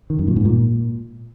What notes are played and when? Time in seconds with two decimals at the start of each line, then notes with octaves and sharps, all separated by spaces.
0.10 D#3
0.19 F#2
0.27 A#2
0.36 G#2
0.45 A#2